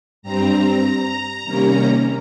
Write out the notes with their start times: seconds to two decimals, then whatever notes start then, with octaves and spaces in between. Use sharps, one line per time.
0.22 G2 G3 C4 A#5
1.43 C3 D#3 G3 A#3 C#4